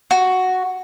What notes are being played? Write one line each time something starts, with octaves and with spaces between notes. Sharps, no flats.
F#4